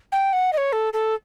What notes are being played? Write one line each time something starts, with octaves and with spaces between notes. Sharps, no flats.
G5
F#5
D#5
C#5
A4
A4